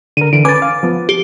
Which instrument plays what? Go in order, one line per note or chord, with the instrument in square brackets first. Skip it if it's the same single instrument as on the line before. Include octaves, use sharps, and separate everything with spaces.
[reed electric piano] D3 A#4 [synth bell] D#7
[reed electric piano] D3 E3 [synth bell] D7
[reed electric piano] C#4 B4 G#5 [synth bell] D6 A6
[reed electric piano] F5
F3 B3
[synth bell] G4